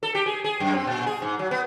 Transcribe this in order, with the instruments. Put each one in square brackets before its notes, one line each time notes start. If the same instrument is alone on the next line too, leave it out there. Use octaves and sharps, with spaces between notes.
[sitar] A4
G4
G#4
G#4
F#2
C4
A#2
G#4
G#2
F#3
B3